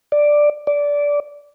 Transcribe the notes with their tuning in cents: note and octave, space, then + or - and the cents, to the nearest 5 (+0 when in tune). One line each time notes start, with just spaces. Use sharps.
D5 +5
D5 -15